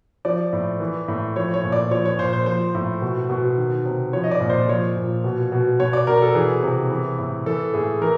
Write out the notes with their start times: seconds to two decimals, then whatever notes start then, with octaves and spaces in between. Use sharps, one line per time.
0.25 F3 D5
0.53 A2
0.80 E3
1.08 A2
1.36 F3 C#5
1.54 C#5
1.63 A#2
1.72 D5
1.91 F3 C#5
2.05 C#5
2.19 A#2 C5
2.33 C5
2.46 F3 C5
2.75 A2
3.02 B2
3.30 B2
3.58 D#3
3.86 C3
4.13 F3 C#5
4.24 D#5
4.31 D5
4.40 A#2
4.50 C5
4.68 F3 C#5
4.96 A#2
5.24 B2
5.52 B2
5.79 B2 C#5
5.93 D5
6.07 B2 A#4
6.22 A4
6.35 E3 G#4
6.63 C3
6.91 E3
7.19 A2
7.46 E3 A4
7.74 A2 G#4
8.01 E3 A#4